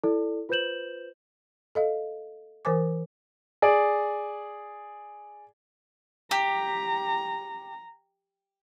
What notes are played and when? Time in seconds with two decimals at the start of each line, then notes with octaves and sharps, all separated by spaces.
0.04 E4 A4 D5
0.49 F4 B4 C5 G6 E7 F#7
1.75 A4 D#5 F5
2.65 E3 A#4 C5 G#5 D6
3.62 G#4 D5
6.31 G4 A#5